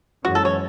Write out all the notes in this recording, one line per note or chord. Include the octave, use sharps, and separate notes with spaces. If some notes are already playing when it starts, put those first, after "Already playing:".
F#2 E3 G#3 C#4 F#4
A4
C#5